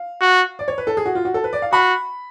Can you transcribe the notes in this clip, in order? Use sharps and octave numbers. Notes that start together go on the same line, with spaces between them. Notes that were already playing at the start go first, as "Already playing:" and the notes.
Already playing: F5
F#4
D5
C#5
B4
A4
G#4
F#4
F4
F#4
A4
B4
D5
F5
F#4 B5